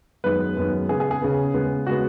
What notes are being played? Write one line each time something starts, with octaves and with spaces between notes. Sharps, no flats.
F#2 D#3 G#3 B3 B4
F#2 D#3 G#3 B3
C#3 B3 G#4
G#4
G#4
C#3 B3
C#3 G#3 B3
C#3 G#3 B3 F#4